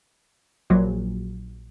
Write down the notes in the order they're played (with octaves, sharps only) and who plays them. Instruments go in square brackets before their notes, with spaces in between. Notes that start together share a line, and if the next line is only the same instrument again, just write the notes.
[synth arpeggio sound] A#1 A#2 F#3